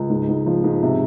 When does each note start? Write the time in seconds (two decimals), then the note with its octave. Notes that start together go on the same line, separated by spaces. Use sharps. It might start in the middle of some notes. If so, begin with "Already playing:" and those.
Already playing: C#2
0.10 G#2
0.28 G#2
0.46 F3
0.64 G#2
0.83 C3